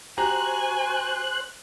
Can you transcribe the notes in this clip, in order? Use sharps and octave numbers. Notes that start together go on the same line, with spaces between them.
F#4 G4 C5 G#5 A#5 F#6